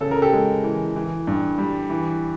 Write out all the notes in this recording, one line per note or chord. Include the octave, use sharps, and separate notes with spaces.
C#3 A4
A#4
G4 A4
G#3
E3
E3
G2
G3
E3